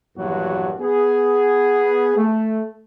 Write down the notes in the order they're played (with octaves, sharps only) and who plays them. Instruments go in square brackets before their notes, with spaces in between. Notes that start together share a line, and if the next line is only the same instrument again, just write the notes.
[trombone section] A#1 E2 G2 F#3 F#4
B3 G#4
A3